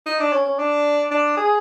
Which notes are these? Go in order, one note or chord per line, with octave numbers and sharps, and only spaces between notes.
D#4
D4
C#4
C#4
D4
D4
G#4